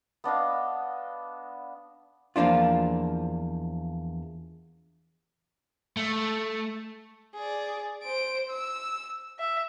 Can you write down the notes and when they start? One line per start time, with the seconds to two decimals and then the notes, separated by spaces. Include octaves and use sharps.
0.24 B3 D4 D#5 F5
2.36 E2 F3 A#3 D4 F4
5.97 A3
7.35 G#4 D5
8.03 C5 D7
8.50 E6
9.39 E5